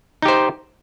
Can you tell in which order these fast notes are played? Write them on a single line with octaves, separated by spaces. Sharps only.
D#4 G4 C5